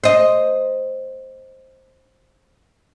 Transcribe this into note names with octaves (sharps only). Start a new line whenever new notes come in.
C5 D#5